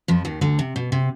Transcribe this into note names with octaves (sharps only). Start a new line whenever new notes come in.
F2 F3
D#2 D#3
D2 D3
C3
B2
C3